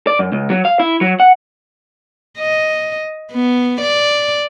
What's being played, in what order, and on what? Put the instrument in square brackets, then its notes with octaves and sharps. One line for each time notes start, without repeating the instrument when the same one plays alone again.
[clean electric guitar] D5
F#2
C#2
F#3
F5
E4
F#3
F#5
[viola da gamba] D#5
B3
D5